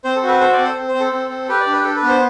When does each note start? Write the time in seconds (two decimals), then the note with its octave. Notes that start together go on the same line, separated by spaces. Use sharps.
0.04 C4 C5
0.16 A4
0.23 F#4
0.28 B4
0.40 A4 C5
0.53 C4 D5
0.64 C5
0.76 C4
0.88 C5
0.94 C4
1.00 A4
1.12 C4
1.30 C4
1.49 G4 B4
1.60 D5
1.66 D4
1.73 B4
1.84 D4 A4
1.96 B4
2.03 B3
2.08 C5